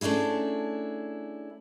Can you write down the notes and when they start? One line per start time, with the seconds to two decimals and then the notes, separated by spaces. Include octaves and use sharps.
0.01 A3 C#4 D4 E4 G#4